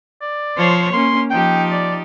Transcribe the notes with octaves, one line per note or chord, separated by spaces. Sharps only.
D5
F3 C5 C#5
A#3 C#4 C6
F3 D#4 G4 G5
D5